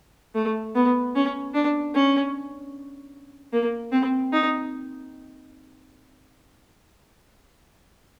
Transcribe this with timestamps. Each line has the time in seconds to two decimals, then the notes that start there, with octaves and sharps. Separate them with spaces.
0.35 A3
0.75 B3
1.15 C#4
1.54 D4
1.94 C#4
3.53 A#3
3.92 C4
4.33 D#4